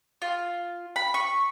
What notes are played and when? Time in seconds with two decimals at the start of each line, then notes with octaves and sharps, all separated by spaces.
0.22 F4
0.96 B5
1.14 C#6